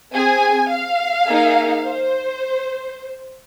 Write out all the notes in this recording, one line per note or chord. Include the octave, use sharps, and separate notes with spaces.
C4 G#4 G#5
F5
A#3 D#4 G#4
C5